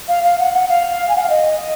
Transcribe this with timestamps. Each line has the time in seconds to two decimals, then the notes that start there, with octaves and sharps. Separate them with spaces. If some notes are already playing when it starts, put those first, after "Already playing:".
0.08 F5
0.24 F5
0.39 F#5
0.54 F#5
0.69 F5
1.09 G#5
1.16 F#5
1.23 F5
1.30 D#5